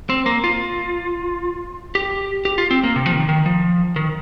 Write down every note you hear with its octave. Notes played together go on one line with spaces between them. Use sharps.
C4
A#3
F4
G4
G4
F4
C4
A#3
C3
F3
D#3
D#3
F3
D#3